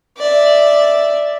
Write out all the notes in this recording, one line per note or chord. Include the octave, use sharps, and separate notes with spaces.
D5 E5